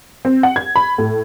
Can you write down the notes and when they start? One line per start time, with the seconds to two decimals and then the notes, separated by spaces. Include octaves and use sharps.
0.25 C4
0.43 F#5
0.56 G#6
0.76 B5
0.98 A2